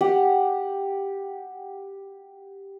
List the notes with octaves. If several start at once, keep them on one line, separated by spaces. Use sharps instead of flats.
G4 F#5